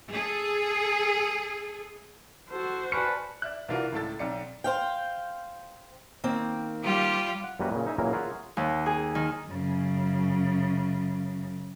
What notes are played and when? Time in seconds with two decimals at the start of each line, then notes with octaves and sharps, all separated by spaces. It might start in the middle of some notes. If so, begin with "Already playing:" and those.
0.11 G#4 A4
2.50 F#4 A4 C5
2.92 B4 D5 G#5 A5 C#6 F6 C#7
3.42 D5 E5 F#6
3.68 C2 E3 D4 F4 F#4 A#4
3.92 C#2 A2 A4 A6
4.19 B1 C4 D5 C#7
4.64 C5 F5 G5
6.24 D#3 A#3 C4
6.83 G3 F4 G4
7.44 F#5
7.60 F#2 G3 A#3 F#4 B4
7.72 A#2 C#3
7.86 D#4 E5 G#5
7.98 A#2 C#3 E3 F#3 A#3 A#4
8.13 F4 G#4 A#4 C#5 E5 F#5
8.57 D#2
8.86 G#4
9.15 D#3
9.48 F#2 C#3